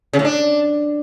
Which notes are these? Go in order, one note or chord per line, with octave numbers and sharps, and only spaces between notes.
C#3
A2
D4